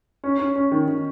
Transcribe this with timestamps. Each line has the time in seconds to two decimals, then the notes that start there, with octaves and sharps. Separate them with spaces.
0.24 C#4
0.39 C#4
0.56 C#4
0.72 D#3
0.88 D#3